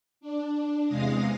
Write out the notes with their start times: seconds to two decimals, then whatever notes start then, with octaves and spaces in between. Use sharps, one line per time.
0.21 D4
0.86 E2 C3 G#3 F5 D#6 A#6